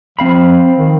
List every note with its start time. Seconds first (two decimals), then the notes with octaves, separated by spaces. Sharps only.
0.19 F3 C4 F5 B5
0.77 D#3